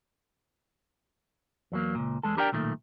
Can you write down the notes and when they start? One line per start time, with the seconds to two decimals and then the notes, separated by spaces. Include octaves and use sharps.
1.72 E2 F#3 A#3
1.95 C#2 A#2
2.23 E2 G#3 G#4 A4
2.37 D4 G4 A#4 D5 D#5 G5
2.52 B1 A#2 D#3 G#3 A3